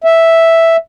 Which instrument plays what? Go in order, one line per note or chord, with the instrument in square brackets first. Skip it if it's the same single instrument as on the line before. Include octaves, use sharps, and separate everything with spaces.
[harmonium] E5